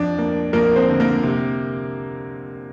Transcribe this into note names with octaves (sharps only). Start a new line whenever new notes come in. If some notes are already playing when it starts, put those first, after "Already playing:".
Already playing: F2 D4 D5
A#3
F2 A#3 A#4
C4 C5
D3
A#3 A#4
C3